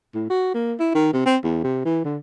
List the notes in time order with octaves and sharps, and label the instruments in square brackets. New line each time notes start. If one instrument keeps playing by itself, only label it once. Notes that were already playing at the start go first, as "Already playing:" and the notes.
[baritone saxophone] A2
F#4
A#3
E4
D#3
C3
C4
E2
C3
E3
D3